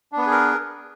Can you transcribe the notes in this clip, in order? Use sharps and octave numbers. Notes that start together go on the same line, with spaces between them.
B3 D4 G#4 A#4 B4